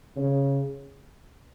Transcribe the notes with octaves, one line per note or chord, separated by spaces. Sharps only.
C#3